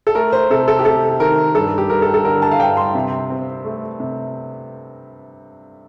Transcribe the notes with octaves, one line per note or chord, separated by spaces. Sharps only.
A4
A3 A#4
C5
C3 A4
A4
G4
C3 A4
D#3 A#4
G2 A4
G4
G2 A#4
A4
A4
D3 A#4
A5
F5
G2 G5
C6
C3
C4
A3
C3